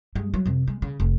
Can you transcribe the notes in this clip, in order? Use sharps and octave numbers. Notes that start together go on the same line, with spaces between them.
G2 G#3
F#3
F2 C3
G#3
C#3
F1